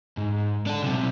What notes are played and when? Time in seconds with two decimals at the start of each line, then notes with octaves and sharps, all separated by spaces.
0.17 G#2
0.67 D4 A4
0.82 B1 C3